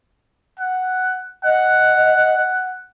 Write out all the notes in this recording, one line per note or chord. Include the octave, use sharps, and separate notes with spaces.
F#5
D#5 F#5